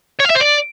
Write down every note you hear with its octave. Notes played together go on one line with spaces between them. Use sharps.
C#5
F5
E5
C5
D5